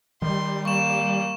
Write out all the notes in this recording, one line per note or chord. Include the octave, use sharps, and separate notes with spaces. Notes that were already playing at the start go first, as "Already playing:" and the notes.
D#3 G3 C6
A#3 C#6 E7